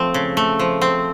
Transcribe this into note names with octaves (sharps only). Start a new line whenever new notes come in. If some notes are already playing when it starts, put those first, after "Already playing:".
Already playing: F3 A3 C4
C#3
A3
F3
C4